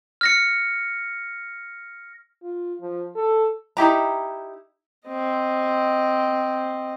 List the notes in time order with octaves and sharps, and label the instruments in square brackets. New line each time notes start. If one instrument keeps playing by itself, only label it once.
[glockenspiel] F6 A#6 C#7
[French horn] F4
F3
A4
[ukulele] D#4 E4 G4 A#5
[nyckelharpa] C4 D#5